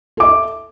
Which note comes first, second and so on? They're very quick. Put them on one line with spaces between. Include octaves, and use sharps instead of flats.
A4 D6 E5